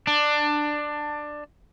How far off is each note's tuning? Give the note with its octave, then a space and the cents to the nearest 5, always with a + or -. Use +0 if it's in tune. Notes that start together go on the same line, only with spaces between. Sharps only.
D4 +15